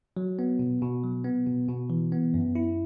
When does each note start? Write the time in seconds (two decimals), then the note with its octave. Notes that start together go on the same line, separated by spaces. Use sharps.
0.17 F#3
0.39 B3
0.59 B2
0.82 B2
1.04 F#3
1.25 B3
1.47 B2
1.69 B2
1.90 E3
2.12 B3
2.34 F#2
2.55 E4